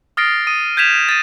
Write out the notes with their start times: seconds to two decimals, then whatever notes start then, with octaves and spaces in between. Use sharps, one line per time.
0.17 D#6 F6 A6 A#6 C7 D7
0.47 D#6 D#7
0.77 G6 G#6 B6 E7 F7
1.09 A6 A#6 D#7